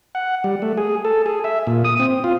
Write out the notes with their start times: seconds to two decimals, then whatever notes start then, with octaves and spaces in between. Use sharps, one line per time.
0.15 F#5
0.44 G3
0.62 A3
0.77 G#4
1.05 A4
1.26 G#4
1.44 E5
1.67 A#2
1.85 D#6
2.00 C4
2.24 F4